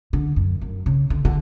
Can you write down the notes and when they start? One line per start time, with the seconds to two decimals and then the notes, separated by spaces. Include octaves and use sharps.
0.13 D3
0.36 F#2
0.61 F#2
0.86 C#3
1.10 D3
1.25 D3